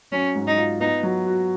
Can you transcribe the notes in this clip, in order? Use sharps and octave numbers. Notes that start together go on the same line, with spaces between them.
F#3 C#4
G#2
D#4
F4
B3 D#4
F#3
F#4